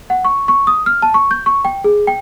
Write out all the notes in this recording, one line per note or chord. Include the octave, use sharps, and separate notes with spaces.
F#5
C#6
C#6
D#6
F6
A5
C#6
G6
C#6
G5
G#4
G5